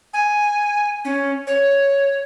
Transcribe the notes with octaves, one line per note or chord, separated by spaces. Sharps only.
G#5
C#4
C#5